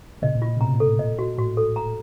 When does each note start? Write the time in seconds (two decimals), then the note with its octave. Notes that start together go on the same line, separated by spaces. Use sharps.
0.22 A#2 C#3 D#5
0.35 A#2
0.42 F4
0.48 A#2
0.57 C#3
0.60 A2 C3 A#5
0.73 A#2
0.80 A4
0.86 A2
0.99 A#2 D#5
1.19 F#4
1.38 A2 F#4
1.57 A4
1.76 A#5